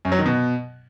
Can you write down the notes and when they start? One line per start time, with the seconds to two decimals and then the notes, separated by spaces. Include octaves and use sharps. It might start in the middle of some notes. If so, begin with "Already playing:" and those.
0.05 F#2
0.12 F#3
0.19 D#3
0.26 B2